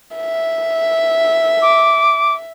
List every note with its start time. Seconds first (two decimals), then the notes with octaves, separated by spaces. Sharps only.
0.16 E5
1.61 D6